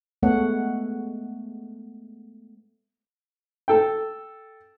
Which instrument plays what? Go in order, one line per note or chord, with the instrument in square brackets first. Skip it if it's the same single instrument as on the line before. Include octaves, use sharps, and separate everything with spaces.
[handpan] G#3 A3 B3 A4 C#5 F#5
[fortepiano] A4 G5